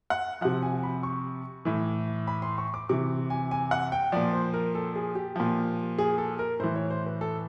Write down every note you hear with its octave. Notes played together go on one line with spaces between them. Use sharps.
F#5
C3 F3 F#5
G#5
B5
C#6
A2 E3
B5
C6
C#6
D6
C3 E3 D6
G#5
G#5
F#5
G5
A#2 F3 D5
C5
A#4
A4
G#4
G4
A#2 F3
G#4
A4
A#4
A2 E3 C5
C#5
C5
B4
A4